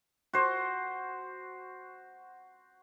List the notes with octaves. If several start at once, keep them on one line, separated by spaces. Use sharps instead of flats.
F#4 C5